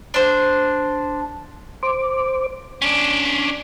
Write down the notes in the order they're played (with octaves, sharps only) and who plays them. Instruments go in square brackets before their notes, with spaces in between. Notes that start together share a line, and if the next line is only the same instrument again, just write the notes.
[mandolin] D4 C5
[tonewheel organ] C5 D6
[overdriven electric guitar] C#4 D4